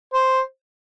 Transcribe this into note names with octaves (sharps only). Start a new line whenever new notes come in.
C5